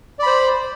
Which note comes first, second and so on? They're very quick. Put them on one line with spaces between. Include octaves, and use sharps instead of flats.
D5 B5 C5